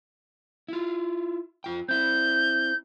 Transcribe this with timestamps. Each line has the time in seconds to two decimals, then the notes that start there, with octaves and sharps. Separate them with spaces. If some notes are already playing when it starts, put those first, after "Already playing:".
0.69 E4 F4
1.64 F2 F4 G5
1.89 C4 E4 G6